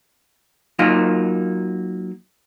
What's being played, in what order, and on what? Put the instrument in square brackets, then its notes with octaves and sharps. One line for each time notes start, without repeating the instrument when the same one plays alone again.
[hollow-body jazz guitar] F#3 A#3 D#4 F4 A#4